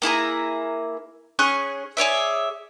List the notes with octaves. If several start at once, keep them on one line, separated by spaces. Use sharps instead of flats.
A#3 E4 G#4 A#5
C#4 G#4 C#6 F#6
G#4 C#5 D5 E5